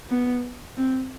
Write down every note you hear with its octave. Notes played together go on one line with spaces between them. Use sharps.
B3
C4